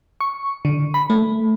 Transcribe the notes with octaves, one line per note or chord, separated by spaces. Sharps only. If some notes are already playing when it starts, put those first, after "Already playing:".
C#6
D3
B5
A3